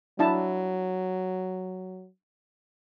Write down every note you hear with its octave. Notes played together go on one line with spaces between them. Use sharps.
F#3 D4 E4 A5